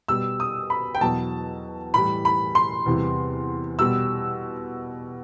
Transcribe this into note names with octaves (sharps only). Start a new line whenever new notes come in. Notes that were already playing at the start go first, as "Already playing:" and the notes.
B2 G3 E6
D#6
B5
G5
E2 B2 F#3 A5
A2 E3 G3 B5
B5
C6
E2 C3 E3 G3
B2 G3 E6